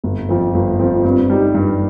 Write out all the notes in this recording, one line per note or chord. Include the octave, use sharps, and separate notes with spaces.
G1
F2 F3 C4
G1
F2 F3 C4
G2
G3 D#4 G4
G2